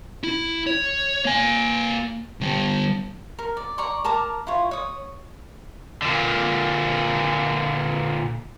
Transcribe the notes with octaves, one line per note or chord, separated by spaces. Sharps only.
E4
C#5
A#3 G#5
D3 G3
A#4
D5
D5 A#5 C#6
A#4 A5 A#5 D6
E4 F4 C#5
C#5 D#6
A#2 D3